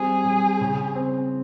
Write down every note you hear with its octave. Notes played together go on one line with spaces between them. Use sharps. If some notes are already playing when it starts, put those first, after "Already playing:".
Already playing: G3 C4 G#4
G3
C#3
C4